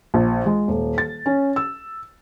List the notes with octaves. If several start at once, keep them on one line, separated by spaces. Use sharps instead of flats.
A#1
G#3
D#1
A6
C#4
E6